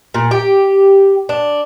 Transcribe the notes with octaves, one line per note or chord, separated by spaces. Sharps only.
A#2
G4
D4